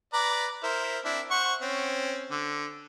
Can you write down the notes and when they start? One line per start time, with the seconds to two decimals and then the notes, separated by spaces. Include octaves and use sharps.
0.13 B4 D5 A#5
0.63 E4 A#4 C5
1.05 C4 D4 E4
1.31 C5 F#5 C#6
1.62 C4 C#4
2.31 D3